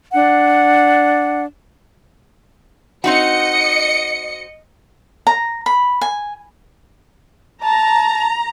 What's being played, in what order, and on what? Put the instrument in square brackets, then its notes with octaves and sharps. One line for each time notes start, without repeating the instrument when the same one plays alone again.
[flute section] D4 F#5
[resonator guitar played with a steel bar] C4 D#4 F#4 [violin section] D#5 C#7
[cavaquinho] A#5
B5
G#5
[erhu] A5 [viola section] A#5